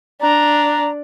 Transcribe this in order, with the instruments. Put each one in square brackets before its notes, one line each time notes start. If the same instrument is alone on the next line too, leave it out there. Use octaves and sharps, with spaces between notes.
[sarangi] D4 [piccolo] A#5